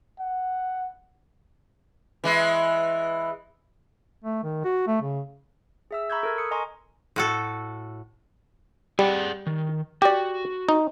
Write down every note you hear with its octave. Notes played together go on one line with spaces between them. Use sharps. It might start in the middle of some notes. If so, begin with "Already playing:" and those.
F#5
E3 G#3 E4
A3
D#3
F#4
A3
C#3
G#4 E5 E6
A#5 B5 C#6 E6 G6 G#6
A4 A#4 G#6
D#6 C#7
D#5 G#5 A#5 C6 C#6
A2 F#4 A4
G3 G#4 D5 F#5
D#3
F#4 G4 D5
D#4